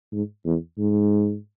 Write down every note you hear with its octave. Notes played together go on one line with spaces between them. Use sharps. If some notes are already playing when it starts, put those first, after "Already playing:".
G#2
E2
G#2